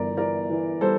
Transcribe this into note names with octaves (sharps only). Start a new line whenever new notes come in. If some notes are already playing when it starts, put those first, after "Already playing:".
Already playing: G1 E3 A#4 D5
E3 A#4 D5
E3
G3 A4 C5